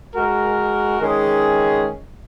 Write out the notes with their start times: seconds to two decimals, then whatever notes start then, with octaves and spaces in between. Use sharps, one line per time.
0.15 G#3 F#4 A#4
1.01 D#3 G#3 C#4 G#4